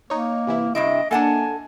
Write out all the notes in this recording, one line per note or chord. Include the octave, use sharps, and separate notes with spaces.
A#3 D#4 C#5
C3 E3 E4
G2 C3 E4 D#5 D7
A#3 D4 A4 F#5 G#5 A5